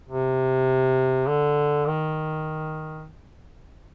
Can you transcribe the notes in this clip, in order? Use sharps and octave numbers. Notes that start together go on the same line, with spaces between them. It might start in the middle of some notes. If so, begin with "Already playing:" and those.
C3
D3
D#3